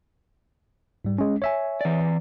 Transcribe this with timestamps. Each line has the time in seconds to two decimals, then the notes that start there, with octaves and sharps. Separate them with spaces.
1.05 G#2 G3
1.18 G#3 C#4
1.42 C#5 E5 G#5
1.81 E3 D5